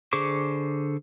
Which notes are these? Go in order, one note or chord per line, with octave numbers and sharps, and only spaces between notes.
D3 G#4 C5 C#6 D6